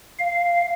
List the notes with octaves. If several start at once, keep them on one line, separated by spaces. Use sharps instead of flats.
F5